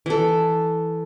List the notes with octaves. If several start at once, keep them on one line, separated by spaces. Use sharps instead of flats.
E3 A4